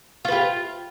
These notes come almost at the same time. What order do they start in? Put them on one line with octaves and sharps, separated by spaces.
F4 B4 G4